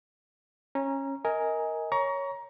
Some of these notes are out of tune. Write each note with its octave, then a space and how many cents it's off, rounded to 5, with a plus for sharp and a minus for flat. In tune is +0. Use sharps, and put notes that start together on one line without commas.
C#4 -20 A#5 +10
A#4 +0 D#5 +25 G#5 +0
C#5 +5 A#5 +20 C#6 +25